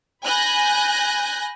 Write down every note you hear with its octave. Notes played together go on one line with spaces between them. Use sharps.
G#5 B5 F#6 G6 A#6